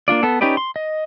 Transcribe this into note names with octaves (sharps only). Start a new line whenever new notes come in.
A#3 D4 F4 D5
B3 A4
C#4 D#4 G4 B4 D5
C6
D#5